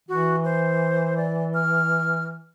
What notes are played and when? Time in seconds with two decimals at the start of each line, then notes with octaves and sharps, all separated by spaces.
0.09 E3 F#4
0.45 C5
1.17 D5
1.54 F6